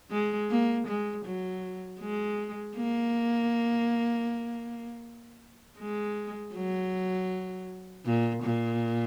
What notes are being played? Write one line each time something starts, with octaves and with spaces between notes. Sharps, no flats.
G#3
A#3
G#3
F#3
G#3
A#3
G#3
F#3
A#2
A#2